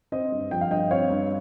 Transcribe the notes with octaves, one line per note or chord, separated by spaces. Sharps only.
C4 C5 D#5
G2
F3 G5
F5
G2 D#5 G5
C4 C#5 F5
G2